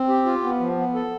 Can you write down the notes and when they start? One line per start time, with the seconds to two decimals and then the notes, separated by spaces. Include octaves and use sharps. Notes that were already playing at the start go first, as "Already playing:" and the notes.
Already playing: C4
0.09 G4
0.26 F4
0.43 B3
0.60 F3
0.77 B3
0.95 A4